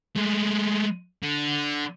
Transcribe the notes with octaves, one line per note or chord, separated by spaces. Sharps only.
G#3 A3
D3